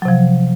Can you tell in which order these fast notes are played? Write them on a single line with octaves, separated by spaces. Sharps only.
F#3 C3 F3